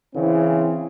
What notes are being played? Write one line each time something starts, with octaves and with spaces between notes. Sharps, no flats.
C#3 E3 C4